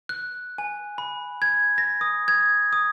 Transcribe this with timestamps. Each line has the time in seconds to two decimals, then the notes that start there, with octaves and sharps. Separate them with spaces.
0.09 F#6
0.58 G#5
0.98 B5
1.42 G#6
1.78 A#6
2.01 D#6
2.28 G#6
2.73 D#6